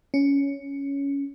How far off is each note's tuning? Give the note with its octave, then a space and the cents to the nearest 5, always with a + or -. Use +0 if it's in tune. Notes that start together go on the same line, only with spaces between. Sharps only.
C#4 +10